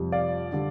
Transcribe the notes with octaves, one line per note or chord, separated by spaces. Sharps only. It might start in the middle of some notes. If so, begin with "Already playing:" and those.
Already playing: F2 C3 G3
D5 F5
D3 G3